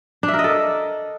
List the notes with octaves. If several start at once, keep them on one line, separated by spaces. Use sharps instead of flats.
D4
E5
A#4
D#5
A4